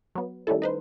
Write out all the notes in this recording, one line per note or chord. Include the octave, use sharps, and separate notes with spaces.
F#3 B3
D#3 G3 A3 C#4 E4 A4
D#4 B4 C5